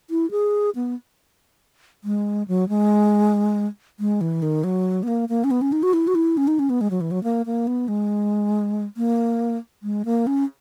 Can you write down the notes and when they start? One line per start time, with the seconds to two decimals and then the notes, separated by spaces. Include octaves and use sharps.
0.10 E4
0.31 G#4
0.75 B3
2.04 G#3
2.48 F#3
2.69 G#3
4.00 G#3
4.21 E3
4.42 D#3
4.64 F#3
5.03 B3
5.08 A#3
5.29 A#3
5.44 C#4
5.51 B3
5.61 C#4
5.72 D#4
5.83 F#4
5.93 E4
6.07 F#4
6.15 E4
6.37 C#4
6.48 D#4
6.59 C#4
6.70 B3
6.81 G#3
6.91 F#3
7.01 E3
7.11 F#3
7.24 A#3
7.46 A#3
7.67 B3
7.88 G#3
8.97 A#3
9.83 G#3
10.05 A#3
10.27 C#4